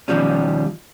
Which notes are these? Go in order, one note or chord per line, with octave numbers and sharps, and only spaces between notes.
D#2 B2 F3 G3 C#4